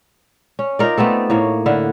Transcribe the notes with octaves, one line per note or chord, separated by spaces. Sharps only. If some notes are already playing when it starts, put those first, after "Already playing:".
C#4
D#4 F4 A#4 D5
A3 B3 C4 A4
A2 A#3 C#5
D3 E4 F5 F#5